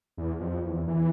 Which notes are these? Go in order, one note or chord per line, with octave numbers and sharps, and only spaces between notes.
E2
F2
E2
E3